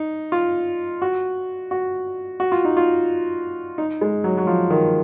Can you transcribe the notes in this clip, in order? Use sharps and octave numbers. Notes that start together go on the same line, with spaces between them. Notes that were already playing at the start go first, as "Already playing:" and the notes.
Already playing: D#4
F4
F#4
F#4
F#4
F4
D#4
F4
D#4
G#3
F#3
F#3
F3
D#3